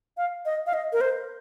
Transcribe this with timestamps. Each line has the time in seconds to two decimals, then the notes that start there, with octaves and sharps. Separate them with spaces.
0.17 F5
0.45 D#5
0.66 F5
0.74 D#5
0.93 A#4
1.01 C5